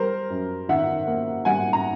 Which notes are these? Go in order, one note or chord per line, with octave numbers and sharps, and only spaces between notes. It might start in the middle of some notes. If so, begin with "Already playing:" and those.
Already playing: G3 A#4 C5
F#2
D#3 E5 F#5
A#3
G3 F#5 G#5
A#5